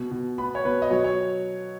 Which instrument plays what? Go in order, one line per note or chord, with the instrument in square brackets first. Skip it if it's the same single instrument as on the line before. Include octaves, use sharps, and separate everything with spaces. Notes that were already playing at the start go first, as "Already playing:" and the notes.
Already playing: [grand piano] B2
B2
B3 B5
C#5
B2 B4
D#5
F#3 C#5
C#5